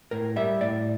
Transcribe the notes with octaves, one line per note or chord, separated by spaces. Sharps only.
A2 A#4
G3 E5
A2 D5